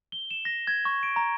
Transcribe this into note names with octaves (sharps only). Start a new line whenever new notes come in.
G7
E7
A#6
G#6
C#6
D7
A#5